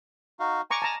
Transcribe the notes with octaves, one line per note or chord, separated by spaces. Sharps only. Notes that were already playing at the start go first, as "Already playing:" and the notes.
D#4 F#4 F5
G#5 A#5 C#6 D6
A5 A#5